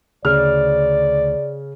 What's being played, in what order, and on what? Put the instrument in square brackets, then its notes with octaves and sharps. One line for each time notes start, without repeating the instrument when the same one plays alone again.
[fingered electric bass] D2 [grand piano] C#3 F6 [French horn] D5